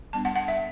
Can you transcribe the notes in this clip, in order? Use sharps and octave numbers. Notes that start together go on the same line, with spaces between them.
G3 B3 D4 A5
F#5
F#5
E5